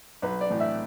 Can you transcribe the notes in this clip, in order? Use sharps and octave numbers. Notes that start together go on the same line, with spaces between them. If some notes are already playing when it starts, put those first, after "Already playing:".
B1 B4
D5
A2 E3
E5